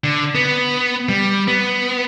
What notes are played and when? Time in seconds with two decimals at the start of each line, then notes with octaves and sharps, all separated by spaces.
0.04 D3
0.35 B3
1.09 G3
1.48 B3